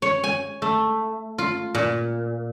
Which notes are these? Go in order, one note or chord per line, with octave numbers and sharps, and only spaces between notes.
C#5
G#5
A3
F4
A#2